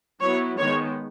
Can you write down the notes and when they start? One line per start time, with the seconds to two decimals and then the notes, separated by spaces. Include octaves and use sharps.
0.21 F#3 B3 E4 C#5
0.58 D#3 G#3 B3 C#5